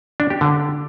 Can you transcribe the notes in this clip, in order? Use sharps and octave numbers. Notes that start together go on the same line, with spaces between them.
D4
G4
D3